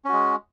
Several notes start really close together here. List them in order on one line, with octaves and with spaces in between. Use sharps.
C#4 F#4 G#3